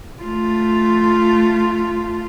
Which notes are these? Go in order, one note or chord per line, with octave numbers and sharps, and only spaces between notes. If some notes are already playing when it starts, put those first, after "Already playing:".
A3 F4